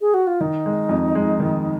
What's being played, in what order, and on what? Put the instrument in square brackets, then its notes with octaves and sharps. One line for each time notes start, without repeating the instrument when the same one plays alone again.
[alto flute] G#4
F#4
F4
[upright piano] D#3 [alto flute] D#4
[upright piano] G#3
F2
G#3
D#3